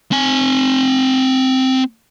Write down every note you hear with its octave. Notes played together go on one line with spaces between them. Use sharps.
C4 G#5